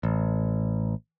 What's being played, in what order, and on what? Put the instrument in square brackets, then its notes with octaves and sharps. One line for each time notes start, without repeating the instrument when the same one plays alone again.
[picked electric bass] A1